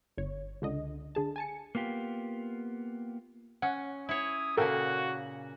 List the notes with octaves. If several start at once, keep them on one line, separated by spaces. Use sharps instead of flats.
G1 C#5
C#2 D3 D#5
D3 G#4 A5
G#5 A5 C#7
A#3 B3 F4 G4
C#4 F#5
E4 C#5 D#6
A#2 C#3 A#3 F#4 A4 A#4 G5